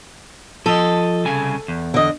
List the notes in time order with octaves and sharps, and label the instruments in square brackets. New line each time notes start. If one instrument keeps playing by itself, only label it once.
[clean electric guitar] F3 D#5 [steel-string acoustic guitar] A4
[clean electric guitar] C2 C#3 G#5
E2
[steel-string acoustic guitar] D3 D#5